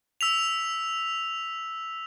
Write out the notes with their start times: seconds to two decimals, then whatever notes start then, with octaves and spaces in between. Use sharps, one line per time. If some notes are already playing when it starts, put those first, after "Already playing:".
0.21 E6 B6 F7